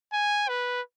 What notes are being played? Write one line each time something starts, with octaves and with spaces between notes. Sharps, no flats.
G#5
B4